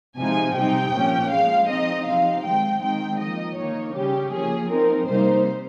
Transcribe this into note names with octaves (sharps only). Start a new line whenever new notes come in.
C3 F3 G#3 D#4 G#5
C3 G3 C4 D#4 G5
A#2 F3 A#3 C#4
F3 G#3 C#4 F5
F3 C4 D#4 D#5
C3 F3 C4 D#4 F5
D#3 G#3 C4 G5
D#3 G#3 C4 D#4 G5
F3 A#3 D#4 D#5
D#3 A#3 D#4 C#5
C#3 G3 C#4 G4
F3 A#3 C#4 G#4
F3 C4 D#4 A#4
C3 G3 A#3 D#4 C5